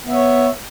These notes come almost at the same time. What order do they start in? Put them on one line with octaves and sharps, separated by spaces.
B3 E5 C#5